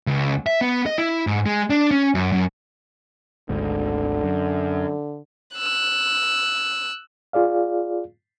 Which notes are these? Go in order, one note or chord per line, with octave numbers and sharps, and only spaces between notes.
C#2
E5
B3
D#5
E4
G#2
G#3
D4
C#4
F#2
F#2
G#1 D2 G#2 D3
F#2
E6 F#6
F4 G#4 D5 F5